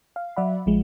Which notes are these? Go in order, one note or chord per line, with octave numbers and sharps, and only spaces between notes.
F5
F#3 D5 E5 F#5 B5
A1 F3 G#3